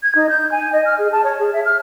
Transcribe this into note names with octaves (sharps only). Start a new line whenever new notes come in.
G#6
D#4
G6
G#5
D#5
F6
G#4
A5
C#5
G#4
E5
F6